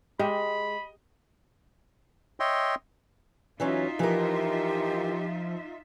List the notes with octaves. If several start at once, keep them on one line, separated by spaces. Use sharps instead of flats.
G#3 G4 D#5 B5
C#5 D#5 E5 G5 C6
E3 F#3 C#4 D#4 F4 E5
E3 F3 G4 A#4